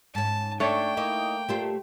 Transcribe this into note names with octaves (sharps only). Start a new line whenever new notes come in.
G#2 C#4 A5
A3 D4 C#5 G5
A#3 D#4 E4 D#5
A#2 A3 G4 C5